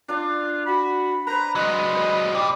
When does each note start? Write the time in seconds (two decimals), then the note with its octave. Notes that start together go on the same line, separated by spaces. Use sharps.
0.08 D4 F4
0.66 F#4 B5
1.27 B4 C5 A#5 B5
1.55 F#3 G#3 D#5
1.95 C5
2.35 A#2 G3